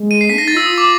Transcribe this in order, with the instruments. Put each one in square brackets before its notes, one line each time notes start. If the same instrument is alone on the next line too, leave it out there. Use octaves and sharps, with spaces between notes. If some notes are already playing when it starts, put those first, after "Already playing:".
Already playing: [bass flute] G#3
[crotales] D#7
C7
[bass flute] D4 [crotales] B6
[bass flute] D#4 [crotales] A#6
[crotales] A6
[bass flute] F4 [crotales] E6
[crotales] D#6
D6